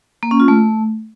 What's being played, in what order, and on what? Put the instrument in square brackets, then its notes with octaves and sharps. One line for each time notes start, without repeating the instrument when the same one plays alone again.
[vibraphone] A#3
C#4
F4
A3